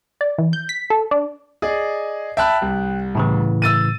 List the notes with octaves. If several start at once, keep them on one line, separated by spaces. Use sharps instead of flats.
D5
E3
G6
B6
A4
D4
G#4 D5 D#5
E5 G5 A5 B5 F#6
C2
A2 C#3 E3
E6 A6 D#7